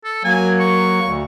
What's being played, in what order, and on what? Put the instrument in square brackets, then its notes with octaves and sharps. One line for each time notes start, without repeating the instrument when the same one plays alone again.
[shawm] A4
[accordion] F#3 A#3 [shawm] G#5
[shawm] C#6
[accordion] D2